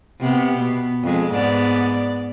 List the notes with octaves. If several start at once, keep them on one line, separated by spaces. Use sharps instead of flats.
C3 B3 G4
B2 B3
F2 G#3
G#2 B3 D5